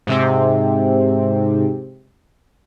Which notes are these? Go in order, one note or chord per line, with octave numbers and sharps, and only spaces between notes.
G#2 C3 C4